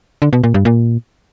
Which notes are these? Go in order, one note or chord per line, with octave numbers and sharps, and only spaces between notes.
D3
B2
A#2
G2
A#2